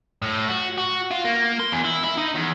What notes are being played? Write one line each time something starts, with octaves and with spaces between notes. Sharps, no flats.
A2
F#4
F#4
F4
A#3
C6
E2
E4
E4
D#4
E2